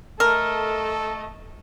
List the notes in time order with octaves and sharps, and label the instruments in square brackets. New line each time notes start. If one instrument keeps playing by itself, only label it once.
[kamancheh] A3 D#5 [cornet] A4 [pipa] A#4 [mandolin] F6